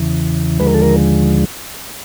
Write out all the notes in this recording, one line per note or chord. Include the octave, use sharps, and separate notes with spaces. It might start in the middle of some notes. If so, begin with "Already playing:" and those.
Already playing: E2 C#3 E3
D#2 D3 F3 G#3 B4
A#4
A4
A#4